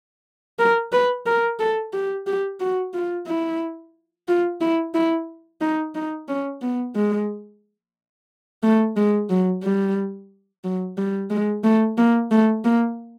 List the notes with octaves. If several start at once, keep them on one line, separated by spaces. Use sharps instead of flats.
A#4
B4
A#4
A4
G4
G4
F#4
F4
E4
F4
E4
E4
D#4
D#4
C#4
B3
G#3
A3
G#3
F#3
G3
F#3
G3
G#3
A3
A#3
A3
A#3